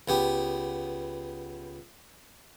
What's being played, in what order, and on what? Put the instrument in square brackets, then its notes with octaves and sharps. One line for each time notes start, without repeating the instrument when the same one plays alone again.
[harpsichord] C#2 B3 G4